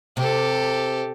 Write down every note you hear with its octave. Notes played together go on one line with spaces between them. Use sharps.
C3 G4 A4